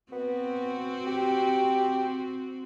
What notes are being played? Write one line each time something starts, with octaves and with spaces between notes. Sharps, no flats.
B3 C4 F#4
G4